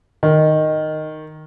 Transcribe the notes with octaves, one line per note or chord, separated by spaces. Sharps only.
D#3